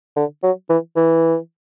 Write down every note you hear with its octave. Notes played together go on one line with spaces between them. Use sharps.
D3
F#3
E3
E3